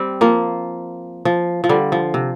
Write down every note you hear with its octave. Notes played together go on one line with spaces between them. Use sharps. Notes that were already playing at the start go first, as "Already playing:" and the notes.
Already playing: G3 C4
F3 A#3
F3
F3
D3 G3
F3
C3